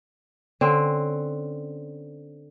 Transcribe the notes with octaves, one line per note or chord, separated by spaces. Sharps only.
D3 C4 C#4